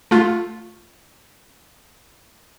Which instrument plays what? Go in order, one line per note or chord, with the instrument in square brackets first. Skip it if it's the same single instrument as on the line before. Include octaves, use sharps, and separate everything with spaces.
[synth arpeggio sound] A3 F4